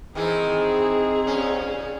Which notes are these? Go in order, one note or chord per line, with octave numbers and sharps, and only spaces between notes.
D#3 E3 C4 D#4 E4 G#4
A#2 C#4